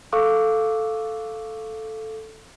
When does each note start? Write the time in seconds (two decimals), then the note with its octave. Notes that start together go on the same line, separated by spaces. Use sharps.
0.12 A4 F5 C#6 D6 E6 F#6